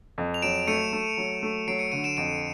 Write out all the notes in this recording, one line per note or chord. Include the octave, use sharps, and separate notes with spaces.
F2
F7
F#3 D7 E7
A3 C#7 D#7
A3
F#3
A3
F#3 C7 D7
C#7 D#7
D3 C#7 D#7
D7 E7
F2 D7 E7